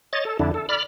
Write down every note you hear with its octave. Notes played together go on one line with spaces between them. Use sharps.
C#5 D#5 A6
A4
F2 D3 D4 E4
A4
D5 B5 F6